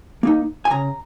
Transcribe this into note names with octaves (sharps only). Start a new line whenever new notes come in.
A#3 D#4
G#5
C#3 A#5